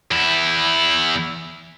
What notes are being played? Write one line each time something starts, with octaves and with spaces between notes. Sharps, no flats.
E2 E4